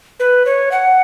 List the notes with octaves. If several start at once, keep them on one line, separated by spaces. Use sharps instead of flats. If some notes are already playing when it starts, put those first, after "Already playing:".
B4
C#5
F#5